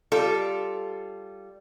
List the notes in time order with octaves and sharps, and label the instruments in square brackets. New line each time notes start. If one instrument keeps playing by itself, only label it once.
[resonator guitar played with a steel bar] G3 F4 A4